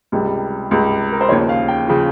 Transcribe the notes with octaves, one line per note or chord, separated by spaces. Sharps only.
C#2 C3 G3
C#2 C3 G3
A#4
C5
D#2 C#3 F3 C#5
F5
G5
C#3 F3